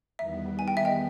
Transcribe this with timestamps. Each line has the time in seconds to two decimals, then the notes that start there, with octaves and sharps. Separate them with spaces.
0.19 E2 D#3 G3 B3 E5
0.59 G#5
0.68 G5
0.77 E5
0.85 D#5 G5